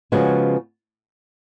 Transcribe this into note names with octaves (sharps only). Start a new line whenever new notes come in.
C#3 F3 G#3 B3 F#4